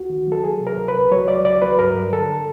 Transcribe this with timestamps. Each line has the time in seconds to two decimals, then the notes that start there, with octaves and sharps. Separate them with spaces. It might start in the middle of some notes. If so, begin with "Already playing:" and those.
Already playing: C#2 F#4
0.10 D#3
0.27 F#3 A4
0.43 F#3 G#4
0.60 C3
0.67 A#4
0.77 C#2
0.88 B4
0.94 C#2
1.11 F#3 C#5
1.27 F#3 D5
1.44 C#2 D5
1.62 F#3 B4
1.79 G2 A#4
1.95 G2
2.13 D3 A4